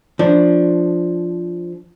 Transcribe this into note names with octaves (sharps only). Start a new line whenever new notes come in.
F3 D4